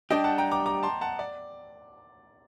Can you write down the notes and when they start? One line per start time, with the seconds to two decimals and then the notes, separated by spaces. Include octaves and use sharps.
0.10 G3 D4 G4 D#5 G5
0.24 F#5 A5
0.38 G5 A#5
0.51 A#5 D6
0.66 A#5 D6
0.83 A5 C6
1.01 F#5 A5
1.19 D5